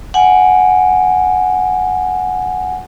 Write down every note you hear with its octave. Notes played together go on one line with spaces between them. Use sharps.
F#5 G#5